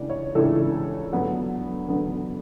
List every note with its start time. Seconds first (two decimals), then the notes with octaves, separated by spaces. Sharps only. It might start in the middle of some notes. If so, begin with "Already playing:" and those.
Already playing: C#2 C#3 E3 A3 D4 D5
0.10 C#5
0.35 C#2 C#3 E3 A3 D4 A4
1.12 D2 D3 F#3 B3
1.88 D2 D3 F#3 B3